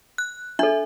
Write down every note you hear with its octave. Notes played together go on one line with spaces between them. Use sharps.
F#6
D4 A4 E5